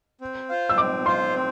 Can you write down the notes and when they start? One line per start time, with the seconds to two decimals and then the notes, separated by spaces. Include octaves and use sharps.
0.21 C4
0.49 F4 C5 F5
0.69 E6
0.78 C4 D6
1.06 F4 C5 F5 C6
1.34 C4